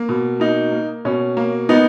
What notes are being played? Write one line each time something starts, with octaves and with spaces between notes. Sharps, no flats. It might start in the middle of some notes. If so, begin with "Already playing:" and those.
Already playing: A#3
B2
A#3 D#4
A#3
B2 C#4
A#3
B3 D#4